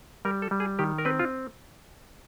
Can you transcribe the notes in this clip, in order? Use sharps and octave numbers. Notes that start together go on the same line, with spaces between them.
G3 A#4
A4
G3
G#4
D#3 G4
A#4
C4 B4
F4